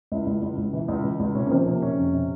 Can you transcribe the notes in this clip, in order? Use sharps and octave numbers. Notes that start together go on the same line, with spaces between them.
C#2 E4
C#2
C#2
C#2
E3
C#2
E3
C#2
C3 C#4
A#3
F3 C4
C3 A#3
C3 C#4
F2
C3